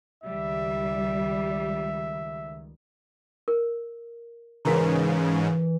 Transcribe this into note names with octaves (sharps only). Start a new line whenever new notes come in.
C#2 D#3 G3 E5
A#4
G#2 C#3 E3 F#4 A#4 A#5